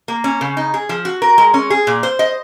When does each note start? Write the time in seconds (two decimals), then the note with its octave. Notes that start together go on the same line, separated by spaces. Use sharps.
0.08 A#3
0.24 C#4
0.41 C#3
0.57 D#4
0.74 G#4
0.89 F3
1.05 F#4
1.22 A#4
1.38 G#3
1.54 C#4
1.70 G#4
1.87 A#2
2.03 C5
2.19 D#5